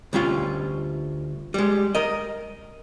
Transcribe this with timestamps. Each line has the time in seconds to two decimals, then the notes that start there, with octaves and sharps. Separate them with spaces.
0.13 D2 G3 C#4 F4
1.54 G3 G#3
1.95 A#4 D#5